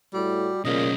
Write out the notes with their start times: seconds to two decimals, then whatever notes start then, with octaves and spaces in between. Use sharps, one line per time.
0.14 A2 G3 F#4
0.65 B1 A#2 C#3 C#4 D#5